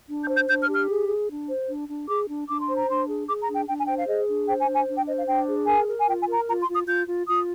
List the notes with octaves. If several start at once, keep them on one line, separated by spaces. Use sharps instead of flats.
D4
G6
C5
G6
D4 G6
F6
G4
F6
G#4
G#4
D4
C5
D4
D4
G#4 D6
D4
D4 D6
C6
C5
A#5
D4 C6
G#4
G#4 D6
A#5
D4
G5
D4 G5
G#5
C5 G5
F5
G#4 D#5
D4
C5 G5
G#5
D4
G#5
D4
G5
C5 D#5
F5
D4 G5
G#4
A#4 G#5
A#4
G#5
F4 G5
G#5
A#4
A#5
F4 A#5
C6
F4
D#6
F4 G6
F4
F4 D#6